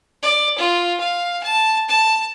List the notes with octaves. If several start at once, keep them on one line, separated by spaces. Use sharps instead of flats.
D5
F4
F5
A5
A5